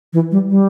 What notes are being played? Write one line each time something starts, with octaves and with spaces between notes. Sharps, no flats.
E3
G3
G3